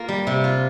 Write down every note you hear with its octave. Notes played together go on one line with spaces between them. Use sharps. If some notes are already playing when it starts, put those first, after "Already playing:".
Already playing: A#3 F4
G3
C3
F4